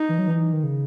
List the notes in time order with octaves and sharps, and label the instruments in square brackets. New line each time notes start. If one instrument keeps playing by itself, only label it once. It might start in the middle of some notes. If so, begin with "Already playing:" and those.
Already playing: [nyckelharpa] D#4
[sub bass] E3
F#3
E3
D#3
C#3